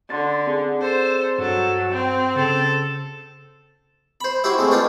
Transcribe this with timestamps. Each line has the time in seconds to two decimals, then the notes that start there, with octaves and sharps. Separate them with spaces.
0.10 D3 C6 A6
0.47 C4 G#4
0.82 A4 C5
1.38 G2 F#3 A4
1.92 C4 G5
2.36 C#3 A4
4.21 C5 B5
4.44 E4 F#4 G4 C5 E5
4.58 G#3 A3 C4
4.71 D4 D#4 F4 G4 B4